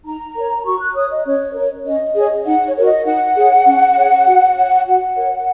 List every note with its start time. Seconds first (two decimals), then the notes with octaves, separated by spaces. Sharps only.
0.05 D#4 A#5
0.35 A#4 C#5
0.65 F#4 C#6
0.80 F#6
0.95 C#5 D#6
1.10 D#5
1.25 C#4 C#5
1.55 A#4 C#5
1.86 C#4 D#5
2.15 G#4 C#5
2.46 D#4 F#5
2.66 C#5
2.76 F#4 A#4 C#5
2.85 D#5
3.06 D#4 F#5
3.36 G#4 C#5
3.66 C#4
3.96 G#4 C#5
4.26 F#4
4.57 C#5
4.86 F#4 F#5
5.17 A#4 C#5